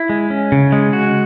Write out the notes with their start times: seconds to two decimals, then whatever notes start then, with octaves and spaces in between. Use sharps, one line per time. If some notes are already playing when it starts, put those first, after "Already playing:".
Already playing: E4
0.09 G#3
0.30 C#4
0.52 C#3
0.72 G#3
0.93 F#4